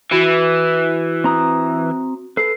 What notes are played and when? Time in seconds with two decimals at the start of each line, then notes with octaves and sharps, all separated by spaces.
0.12 E3 F#4
1.24 C4 A#5 D#6
2.37 A4 B4 C7